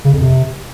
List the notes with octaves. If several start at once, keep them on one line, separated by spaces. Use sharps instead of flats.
C#3
F2
C3